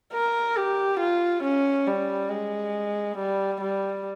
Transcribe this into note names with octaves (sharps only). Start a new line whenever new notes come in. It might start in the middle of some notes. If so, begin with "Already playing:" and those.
A#4
G4
F4
C#4
G3
G#3
G3
G3